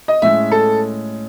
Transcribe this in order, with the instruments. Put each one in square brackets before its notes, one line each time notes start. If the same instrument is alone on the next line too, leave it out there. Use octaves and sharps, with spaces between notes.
[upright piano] D#5
[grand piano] A2 G#3 C#4 [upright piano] E5
[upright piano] A4